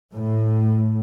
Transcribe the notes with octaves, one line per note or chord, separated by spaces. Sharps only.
A2